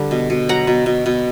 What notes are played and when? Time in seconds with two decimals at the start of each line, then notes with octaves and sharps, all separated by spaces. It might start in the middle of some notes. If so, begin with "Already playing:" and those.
Already playing: D3 G3
0.11 B2
0.30 B2
0.49 F#3 F#5 A#5
0.67 B2
0.86 B2
1.06 B2